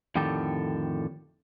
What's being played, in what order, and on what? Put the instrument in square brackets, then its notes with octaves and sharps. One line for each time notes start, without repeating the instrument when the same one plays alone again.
[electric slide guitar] F2 A2 D3 D#3 G4 A4